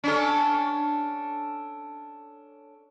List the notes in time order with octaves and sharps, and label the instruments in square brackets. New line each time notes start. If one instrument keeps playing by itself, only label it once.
[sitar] C#4 D4 A4